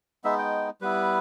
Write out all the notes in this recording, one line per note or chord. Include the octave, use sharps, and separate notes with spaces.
G#3 B3 D#4 E5
G5
G3 B3 E4 B4